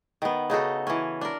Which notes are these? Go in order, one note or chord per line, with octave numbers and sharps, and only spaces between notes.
D#3 B3
C#3 D#4 F#4 A4
E3 C#4
D4 A#4